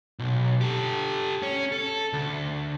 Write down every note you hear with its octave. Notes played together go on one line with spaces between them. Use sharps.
B1
G4 A4
C#4
A4
D2